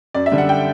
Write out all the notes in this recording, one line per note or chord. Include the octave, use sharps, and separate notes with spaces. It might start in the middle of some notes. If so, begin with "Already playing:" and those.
F#2 D5
E5
D3 G3
F#5
G5